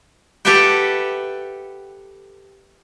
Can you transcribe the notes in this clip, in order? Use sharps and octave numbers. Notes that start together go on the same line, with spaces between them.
G4 A4 B4 E5 F#5 G5